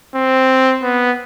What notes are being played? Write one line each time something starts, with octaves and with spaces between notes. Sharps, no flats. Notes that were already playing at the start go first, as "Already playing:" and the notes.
C4
B3